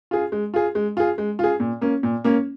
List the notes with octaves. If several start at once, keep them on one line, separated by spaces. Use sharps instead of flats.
F4 G#4
G#3
F4 G#4
G#3
F4 G#4
G#3
F4 G#4
A#2
A#3 C#4
A#2
A#3 C#4